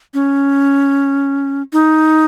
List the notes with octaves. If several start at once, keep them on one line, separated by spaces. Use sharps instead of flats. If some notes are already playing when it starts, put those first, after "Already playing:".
C#4
D#4